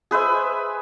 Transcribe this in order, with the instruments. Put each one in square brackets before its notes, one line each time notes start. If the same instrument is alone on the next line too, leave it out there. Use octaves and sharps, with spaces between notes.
[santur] G#4 B4 C5 E5